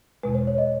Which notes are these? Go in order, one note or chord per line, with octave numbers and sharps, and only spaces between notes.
E2 B2 G#3 B4
C5
C#5
D#5